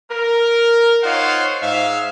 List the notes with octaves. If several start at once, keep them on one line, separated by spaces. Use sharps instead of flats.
A#4
D#4 F4 C5 C#5 F5 F#5
G#2 E5 F5